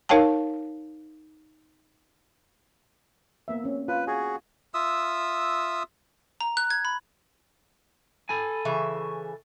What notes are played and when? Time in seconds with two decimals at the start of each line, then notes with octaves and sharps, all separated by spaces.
0.09 D#4 A#4 C#5 F5 G5 A5
3.48 A#3 B3 E5
3.64 C4 C#4
3.88 F4 B4
4.07 F#4 G#4 G#5
4.74 F4 E5 D#6 E6
6.41 A#5
6.57 F#6
6.70 G#6
6.85 B5
8.29 A4 G#5 B5
8.65 C#3 E3 E5 C#6